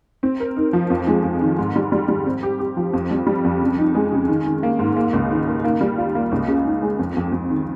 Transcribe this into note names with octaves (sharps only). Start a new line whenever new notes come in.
C4
A#4
D#4
F3
F2
G#3
F2
D#3
G#2
G3
G3
G3
C4
G4
G4
F3
F2
G3
G3
F2
C#3
D#4
G#3
C#3
D#3
D#3
A#3
G#2
A#3
C#2
D#3
A#3
A#3
G3
F4
A#3
C#2
C#3
D#4
G#3
F2
F2
F2
D#3